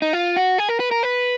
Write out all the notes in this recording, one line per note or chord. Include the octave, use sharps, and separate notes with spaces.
D#4
F4
F#4
G#4
A#4
B4
A#4
B4